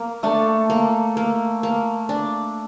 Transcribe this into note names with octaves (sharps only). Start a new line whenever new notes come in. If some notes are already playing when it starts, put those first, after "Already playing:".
Already playing: A#3
A3 D4
A#3
A#3
A#3
D4